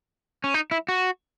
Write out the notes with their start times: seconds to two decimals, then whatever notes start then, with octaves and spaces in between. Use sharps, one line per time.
0.44 C#4
0.54 D#4
0.71 E4
0.89 F#4